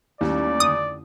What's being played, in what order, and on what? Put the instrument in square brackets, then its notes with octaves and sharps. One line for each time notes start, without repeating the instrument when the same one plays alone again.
[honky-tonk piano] D#2 G3 [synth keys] A3 C#4 E4 [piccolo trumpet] D5
[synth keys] F2 D3 [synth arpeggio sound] D#6